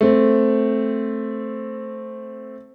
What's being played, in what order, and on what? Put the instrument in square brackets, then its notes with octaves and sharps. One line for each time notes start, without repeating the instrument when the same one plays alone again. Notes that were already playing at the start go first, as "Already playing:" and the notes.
[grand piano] A3 C4